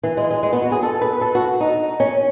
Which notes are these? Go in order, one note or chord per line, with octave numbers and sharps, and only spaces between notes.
E3
G#3
G#3
G#3
B3
F#4
G#4
A4
B4
A4
F#4
D#4
C#4